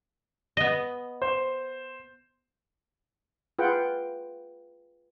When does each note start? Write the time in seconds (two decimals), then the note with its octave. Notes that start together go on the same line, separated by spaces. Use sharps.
0.57 B3 D#5
1.22 C5
3.59 F4 G#4 B4 F#5 G5